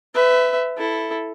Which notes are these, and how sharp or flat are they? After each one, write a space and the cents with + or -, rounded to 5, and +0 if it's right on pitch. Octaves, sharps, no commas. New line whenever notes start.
B4 +25 E5 +0
E4 +0 A4 +0